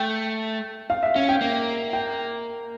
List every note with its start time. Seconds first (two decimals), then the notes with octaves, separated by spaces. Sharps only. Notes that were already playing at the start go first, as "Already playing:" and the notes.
Already playing: A3 G5
0.90 F5
1.03 E5
1.15 C#4 F5
1.29 G5
1.41 A#3
1.93 G5